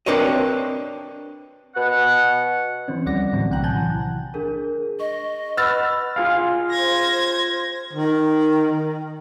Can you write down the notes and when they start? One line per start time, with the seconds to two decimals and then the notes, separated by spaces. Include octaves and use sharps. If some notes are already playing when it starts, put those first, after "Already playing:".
0.06 C4 D4 A#4 B4 C#5 D#5
1.75 B2 F#5
2.88 E3 F3 C4 C#4
3.06 D2 G3 D5 F#5 A#6
3.33 A2 D3 E3 F#3 C4
3.50 B1 C3 F#5 G5 A#5 F#6
3.64 G#5 A5 F#6 G6
3.76 E3
4.34 D4 G#4 A#4
5.00 D#5 C#6
5.57 B4 F#5 E6 F6 A6
6.16 F4 G#4 F5
6.70 C5 G#6 A#6
7.93 D#3